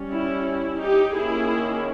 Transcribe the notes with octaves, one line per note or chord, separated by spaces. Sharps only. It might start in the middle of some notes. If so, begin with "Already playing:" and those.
Already playing: G3 C#4
E4
E4
D#4 G4
D#3 A#3 C#4 E4 G#4